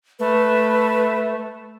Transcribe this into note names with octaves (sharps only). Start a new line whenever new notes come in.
A3 B4